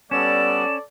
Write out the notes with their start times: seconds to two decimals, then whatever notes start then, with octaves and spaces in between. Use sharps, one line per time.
0.11 G3 B3 C#4 A4 D5 E7